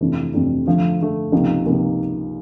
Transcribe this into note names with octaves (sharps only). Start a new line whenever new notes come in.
F2 C3 E3 A3 D4
F2 C3 E3 A3 D4
D3 F3 A3
D3 F3 A3
C#2 C3 F3 A#3 D#4
C#2 C3 F3 A#3 D#4